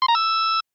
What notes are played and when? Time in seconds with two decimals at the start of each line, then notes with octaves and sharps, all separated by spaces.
0.02 C6
0.08 A#5
0.15 E6